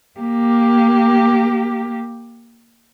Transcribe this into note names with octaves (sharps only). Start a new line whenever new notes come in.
A#3 G4